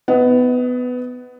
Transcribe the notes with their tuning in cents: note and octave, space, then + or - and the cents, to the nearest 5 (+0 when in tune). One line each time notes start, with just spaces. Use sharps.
B3 +15 D#5 +30 F#5 +10